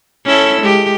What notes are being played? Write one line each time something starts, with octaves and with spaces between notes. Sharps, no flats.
C#4 E4 A4
G#3 G4